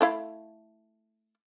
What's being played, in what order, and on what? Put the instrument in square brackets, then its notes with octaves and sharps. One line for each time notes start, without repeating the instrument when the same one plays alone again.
[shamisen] A3 E4 F5